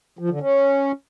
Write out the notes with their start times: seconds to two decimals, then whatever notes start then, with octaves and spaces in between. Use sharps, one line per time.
0.19 F3
0.30 D3
0.41 C#4